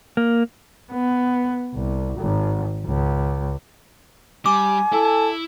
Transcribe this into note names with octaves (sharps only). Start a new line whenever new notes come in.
A#3
B3
C2
G#1
C#2
G3 G#5 D6
E4 A4